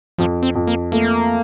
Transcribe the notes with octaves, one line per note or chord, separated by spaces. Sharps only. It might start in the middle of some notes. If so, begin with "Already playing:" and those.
F2 F3
C4
F2
A#3
A3 A#3